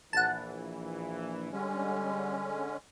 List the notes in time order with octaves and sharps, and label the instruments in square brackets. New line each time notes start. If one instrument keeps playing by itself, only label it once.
[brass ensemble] A#1 E3 [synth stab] F#5 A5
[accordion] D3 G#3 C#4 [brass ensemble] G3